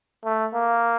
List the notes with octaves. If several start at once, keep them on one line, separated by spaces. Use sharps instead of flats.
A3
A#3